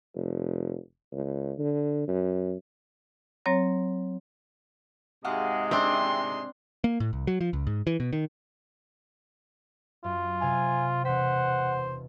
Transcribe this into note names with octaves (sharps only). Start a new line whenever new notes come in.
F1
C#2
D3
F#2
F#3 C4 C#5 A#5 A#6
G#2 C3 G#3 F#4 F5 F#5
C4 D4 E5 G5 C6
A#3
A2
C2
F#3
F3
C#2
G#2
E3
B2
D#3
F#2 F4
C3 F5 G#5 F6
E1 C5 F#5 B6